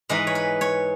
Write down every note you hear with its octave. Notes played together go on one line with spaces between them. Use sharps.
G#2 E3 G#3 B4
C#5
B4
C#5